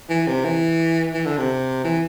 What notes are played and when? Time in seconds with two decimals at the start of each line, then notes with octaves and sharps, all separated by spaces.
0.09 E3
0.27 C3
0.44 E3
1.14 E3
1.26 D3
1.37 C3
1.84 E3